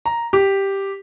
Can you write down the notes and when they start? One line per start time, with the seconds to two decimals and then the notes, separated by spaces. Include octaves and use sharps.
0.06 A#5
0.33 G4